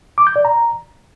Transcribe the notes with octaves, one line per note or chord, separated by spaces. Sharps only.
D6
G6
D5
A#5